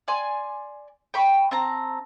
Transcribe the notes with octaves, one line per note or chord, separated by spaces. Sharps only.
D5 G#5 C6
G5 B5 C#6
C4 A5 A#5